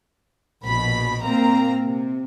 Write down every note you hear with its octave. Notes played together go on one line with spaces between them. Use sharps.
A#1 B2 B5
A#2 A#3 C4 A#5
C3